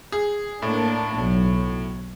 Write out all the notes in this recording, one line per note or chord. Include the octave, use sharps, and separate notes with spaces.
G#4
A2 A#3 D4
B1